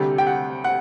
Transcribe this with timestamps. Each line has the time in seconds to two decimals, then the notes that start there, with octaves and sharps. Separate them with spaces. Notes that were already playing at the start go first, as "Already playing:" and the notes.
Already playing: D2 C3 G3 G4
0.18 G5
0.27 F#5
0.64 F#5